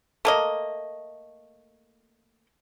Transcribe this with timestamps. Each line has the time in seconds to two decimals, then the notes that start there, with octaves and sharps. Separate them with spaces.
0.25 A3 A#3 D#5